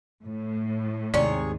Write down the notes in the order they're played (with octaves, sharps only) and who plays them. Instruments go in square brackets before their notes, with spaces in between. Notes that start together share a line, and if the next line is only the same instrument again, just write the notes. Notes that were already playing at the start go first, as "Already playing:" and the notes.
[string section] A2
[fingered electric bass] D#2 G#2 D#3 [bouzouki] C3 G#4 C#5 [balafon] D5